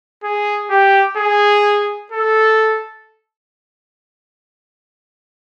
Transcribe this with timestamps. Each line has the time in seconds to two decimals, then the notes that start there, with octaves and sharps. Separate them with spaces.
0.24 G#4
0.71 G4
1.17 G#4
2.12 A4